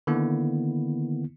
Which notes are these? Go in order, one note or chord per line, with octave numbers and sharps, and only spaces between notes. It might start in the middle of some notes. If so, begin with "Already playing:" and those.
D3 D#3 A#3 B3 E4